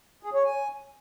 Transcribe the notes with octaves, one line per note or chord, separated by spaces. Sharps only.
G#4
C#5
G#5